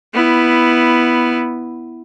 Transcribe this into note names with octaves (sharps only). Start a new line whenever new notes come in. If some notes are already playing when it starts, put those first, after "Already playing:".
B3 E4